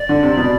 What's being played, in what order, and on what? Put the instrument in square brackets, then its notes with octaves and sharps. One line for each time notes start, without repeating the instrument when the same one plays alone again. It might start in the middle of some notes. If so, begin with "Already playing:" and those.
Already playing: [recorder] D5
[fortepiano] D3
C3
B2